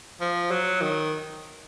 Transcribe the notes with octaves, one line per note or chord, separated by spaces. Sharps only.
F3
F#3
D#3